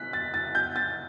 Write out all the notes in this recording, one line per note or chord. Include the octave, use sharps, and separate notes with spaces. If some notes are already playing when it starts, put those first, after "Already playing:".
Already playing: F#6 B6
A6
A6
G6
A6